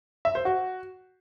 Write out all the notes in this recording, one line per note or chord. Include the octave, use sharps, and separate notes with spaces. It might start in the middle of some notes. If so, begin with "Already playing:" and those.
E5
C5
F#4